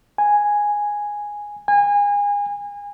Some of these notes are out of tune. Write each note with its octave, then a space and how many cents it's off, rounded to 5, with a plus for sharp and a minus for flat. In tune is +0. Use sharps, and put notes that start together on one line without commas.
G#5 -5
G#5 -30